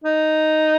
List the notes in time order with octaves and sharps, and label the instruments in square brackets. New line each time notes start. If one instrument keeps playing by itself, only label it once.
[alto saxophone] D#4